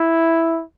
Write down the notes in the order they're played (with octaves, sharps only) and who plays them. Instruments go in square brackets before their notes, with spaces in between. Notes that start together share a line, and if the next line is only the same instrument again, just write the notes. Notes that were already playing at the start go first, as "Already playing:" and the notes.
Already playing: [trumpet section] E4